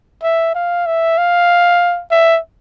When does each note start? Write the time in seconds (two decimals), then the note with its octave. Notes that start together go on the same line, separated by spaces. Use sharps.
0.23 E5
0.55 F5
0.86 E5
1.18 F5
2.11 E5